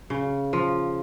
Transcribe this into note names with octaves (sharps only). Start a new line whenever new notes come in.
C#3
F3